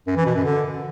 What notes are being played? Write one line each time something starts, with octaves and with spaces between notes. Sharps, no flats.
F#2
E3
B2
F#2
D3